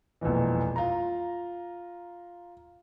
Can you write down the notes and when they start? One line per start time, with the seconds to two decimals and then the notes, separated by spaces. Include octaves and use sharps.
0.21 E1 A#1 F2 B2 E3
0.76 F4 A#5